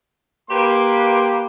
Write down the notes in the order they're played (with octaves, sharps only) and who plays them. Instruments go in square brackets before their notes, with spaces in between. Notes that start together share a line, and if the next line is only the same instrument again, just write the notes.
[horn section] A#3 G4 B4 [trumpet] C6